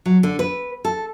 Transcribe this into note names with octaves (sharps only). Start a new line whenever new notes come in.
F#3
D3
B4
A4